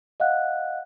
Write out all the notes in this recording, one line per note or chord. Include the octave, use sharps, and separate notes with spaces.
D#5 F5 F#5 F#6